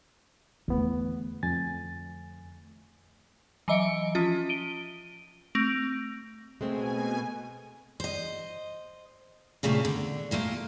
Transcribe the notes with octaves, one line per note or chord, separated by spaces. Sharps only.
E2 D3 A3 B3
F2 G#5 A6
E3 F#3 D#5 E5 C#7 D7
F3 C#4 F4
D7 D#7 G7
A3 C4 A#6 D7 F7
B2 G#3 A3 C4 G#5
C5 D#5
A#2 C#3 A3 C4
D3
A#2 A3 A#3 F4